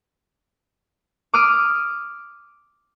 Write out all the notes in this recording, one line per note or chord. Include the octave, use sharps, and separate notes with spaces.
D6 D#6 F6 D7 D#7